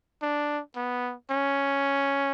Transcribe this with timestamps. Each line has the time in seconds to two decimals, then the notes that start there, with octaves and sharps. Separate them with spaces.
0.22 D4
0.76 B3
1.30 C#4